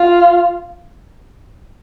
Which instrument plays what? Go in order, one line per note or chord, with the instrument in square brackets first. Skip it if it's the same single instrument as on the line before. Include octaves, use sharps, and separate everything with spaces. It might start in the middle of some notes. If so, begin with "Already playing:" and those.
Already playing: [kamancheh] F4